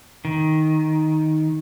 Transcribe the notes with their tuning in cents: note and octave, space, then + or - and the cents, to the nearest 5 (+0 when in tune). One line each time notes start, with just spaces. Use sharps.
D#3 +5